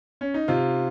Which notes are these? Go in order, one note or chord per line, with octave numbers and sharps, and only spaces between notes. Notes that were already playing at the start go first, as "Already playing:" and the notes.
C#4
D#4
C3 F4